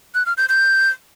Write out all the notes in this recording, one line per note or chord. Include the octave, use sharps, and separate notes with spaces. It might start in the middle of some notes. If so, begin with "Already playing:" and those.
F#6
F6
G6
G6